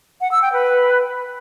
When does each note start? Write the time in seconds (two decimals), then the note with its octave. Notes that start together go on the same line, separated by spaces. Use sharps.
0.21 F#5
0.32 E6
0.42 G5
0.53 B4